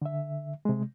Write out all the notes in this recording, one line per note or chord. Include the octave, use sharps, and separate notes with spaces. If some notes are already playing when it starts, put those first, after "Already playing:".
D3 E5
C3 G#3